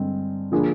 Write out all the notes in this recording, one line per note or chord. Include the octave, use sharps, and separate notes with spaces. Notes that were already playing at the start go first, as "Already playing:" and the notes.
Already playing: G2 D3 G#3 C4
D3 F3 A#3 D4 G#4